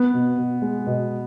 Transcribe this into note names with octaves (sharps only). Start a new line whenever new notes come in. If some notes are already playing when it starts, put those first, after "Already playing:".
Already playing: B3
B2
B2
G#3
B2